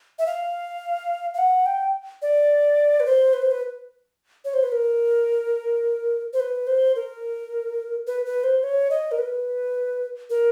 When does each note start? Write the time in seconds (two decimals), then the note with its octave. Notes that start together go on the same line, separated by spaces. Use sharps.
0.19 E5
0.26 F5
1.34 F5
1.38 F#5
1.66 G5
2.22 D5
3.00 B4
3.06 C5
3.33 B4
3.42 C5
3.51 B4
4.45 C#5
4.54 C5
4.63 B4
4.72 A#4
6.33 C5
6.40 B4
6.67 C5
6.96 A#4
8.07 B4
8.26 B4
8.44 C5
8.63 C#5
8.90 D#5
9.12 A#4
9.19 B4
10.30 A#4